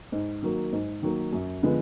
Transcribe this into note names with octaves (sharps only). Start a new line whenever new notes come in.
G#2
D#3 F#3 A#3
G#2
D#3 F#3 A#3
F#2
D3 F3 G#3 B3